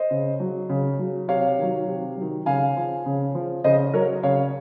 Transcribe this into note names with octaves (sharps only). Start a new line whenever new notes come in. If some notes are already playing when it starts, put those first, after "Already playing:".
Already playing: C5 D#5
C#3
F#3
C#3
F#3
C3 C#5 F5
D#3 F#3
C3
D#3 F#3
C#3 F5 G#5
F3
C#3
F3
C#3 C5 D#5
F#3 A#4 C#5
C#3 C#5 F5